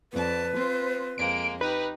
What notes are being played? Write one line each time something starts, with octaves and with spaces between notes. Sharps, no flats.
F2 B4 D5 A5
C4 F4 C5
F2 G#3 A#3 D7
D#4 G4 B4